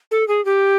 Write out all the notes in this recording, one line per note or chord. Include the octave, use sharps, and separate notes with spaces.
A4
G#4
G4